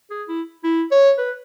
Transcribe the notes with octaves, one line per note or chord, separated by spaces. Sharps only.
G#4
E4
E4
C#5
B4